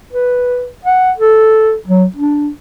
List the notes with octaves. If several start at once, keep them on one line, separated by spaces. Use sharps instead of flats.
B4
F#5
A4
F#3
D4